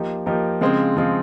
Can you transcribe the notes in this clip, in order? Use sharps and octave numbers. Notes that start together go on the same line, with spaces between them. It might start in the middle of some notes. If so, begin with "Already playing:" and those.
Already playing: F3 A#3 D#4 G4
F3 A#3 D#4 G4
C#3 F3 G#3 C4
C#3 F3 G#3 C4